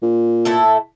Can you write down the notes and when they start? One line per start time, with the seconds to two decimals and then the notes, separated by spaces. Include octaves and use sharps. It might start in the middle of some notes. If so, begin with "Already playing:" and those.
0.02 A#2
0.45 A2 E4 A4